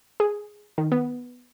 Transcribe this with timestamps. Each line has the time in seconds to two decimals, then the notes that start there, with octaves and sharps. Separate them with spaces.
0.20 G#4
0.78 D#3
0.92 B3